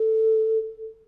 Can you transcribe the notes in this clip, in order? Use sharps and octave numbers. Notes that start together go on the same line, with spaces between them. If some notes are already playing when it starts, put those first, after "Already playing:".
Already playing: A4